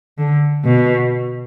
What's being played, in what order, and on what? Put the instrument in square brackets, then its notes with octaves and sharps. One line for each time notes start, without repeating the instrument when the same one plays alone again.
[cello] D3
B2